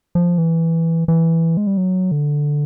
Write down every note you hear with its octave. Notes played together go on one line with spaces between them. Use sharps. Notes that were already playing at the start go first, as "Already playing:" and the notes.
F3
E3
E3
G#3
G3
F#3
D3